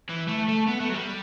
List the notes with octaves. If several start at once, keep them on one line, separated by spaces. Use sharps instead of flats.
E3
A3
A3
B3
A3
F#3
G3